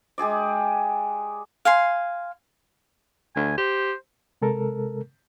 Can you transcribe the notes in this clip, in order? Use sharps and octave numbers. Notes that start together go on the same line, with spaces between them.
G#3 G4 G#4 D5
F5 G#5 C6
D2 G#5
G4 C5
C3 G#3 A4 A#4